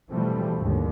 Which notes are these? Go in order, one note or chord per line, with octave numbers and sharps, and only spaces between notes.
B2 E3 F3 G3 A3 C4
G#1 D#2 D3